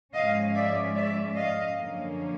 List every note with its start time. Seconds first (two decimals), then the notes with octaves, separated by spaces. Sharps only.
0.14 G#2 F3 G#3 C#4 D#5 F5
0.54 D5 E5
0.95 D5 E5
1.35 D#5 F5
1.76 F#2 D3 F3 A#3 C#4